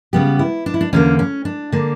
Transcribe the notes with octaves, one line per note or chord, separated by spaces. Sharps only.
C#3 G3 B3 G4
E4
D4
E4
D4
E2 D3 A#3 C#4
C#4
D4
D3 A#3